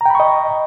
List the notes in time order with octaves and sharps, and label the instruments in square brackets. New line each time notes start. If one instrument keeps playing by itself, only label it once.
[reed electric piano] A#5
G5
B5
C#6
D#5